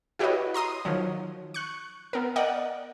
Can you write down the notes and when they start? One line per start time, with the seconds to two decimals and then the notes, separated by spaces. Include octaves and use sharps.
0.19 E4 F#4 G4 B4 C#5 D#5
0.54 A#5 C6 D#6
0.85 D#3 F3 F#3
1.54 C#6 F#6
2.13 B3 A#4
2.36 A#4 D5 D#5 F#5 G5